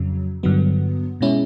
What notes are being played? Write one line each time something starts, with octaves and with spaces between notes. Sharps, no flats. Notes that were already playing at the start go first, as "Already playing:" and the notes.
Already playing: F2 C#3 F#3
G2 D3 F#3 B3
B2 G#3 C#4 E4